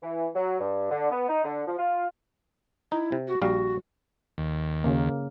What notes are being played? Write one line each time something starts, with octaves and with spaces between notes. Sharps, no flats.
E3
F#3
G2
D3
B3
D#4
D3
F3
F4
D#4 E4
C3
F#4
A#1 G3 F#4 F5
D#2
C#3 A#3